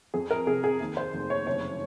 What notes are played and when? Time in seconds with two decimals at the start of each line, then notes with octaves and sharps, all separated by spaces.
0.14 F2 G#4
0.31 A#4
0.47 C3 G#4
0.64 G#4
0.80 D#2
0.97 C5
1.13 F1
1.30 C#5
1.47 F#1 C#5